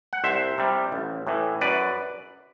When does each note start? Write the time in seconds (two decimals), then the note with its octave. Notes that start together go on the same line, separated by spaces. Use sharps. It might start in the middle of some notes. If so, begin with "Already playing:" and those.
0.13 F#5
0.24 C2 C5 E5
0.58 C3 G3
0.92 A1
1.27 A2 E3
1.61 F#2 B4 D5